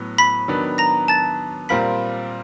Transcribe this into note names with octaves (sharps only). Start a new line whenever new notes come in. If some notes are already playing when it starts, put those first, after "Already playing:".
Already playing: A2 F#3 B3
B5 B6
D#3 F#3 B3 D4
A#5 A#6
A5 A6
A#2 G3 C4 F4 A#4 B5 B6